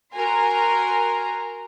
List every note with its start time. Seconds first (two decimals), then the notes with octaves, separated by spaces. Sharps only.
0.13 F#4 A#4 G#5 A#5 C6